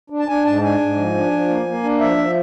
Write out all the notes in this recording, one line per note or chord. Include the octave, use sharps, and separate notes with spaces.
D4
A5
D4 G#5
G#2 A5
D4 G#5
G#2
F3
D4
F3
A#3
A#3
D4
F3 E5
F3